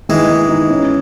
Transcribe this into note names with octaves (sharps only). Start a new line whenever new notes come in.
D#3 E3 G#3
D#3
D#4
C#4